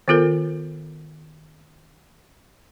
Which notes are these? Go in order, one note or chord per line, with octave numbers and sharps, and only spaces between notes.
D#3 B3 F4 A4 A#4